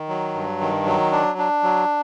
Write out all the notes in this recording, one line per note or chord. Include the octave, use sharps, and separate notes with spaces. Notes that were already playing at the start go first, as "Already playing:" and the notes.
Already playing: D#3
F#3
G2
D#3
F#3
D4
D4
F#3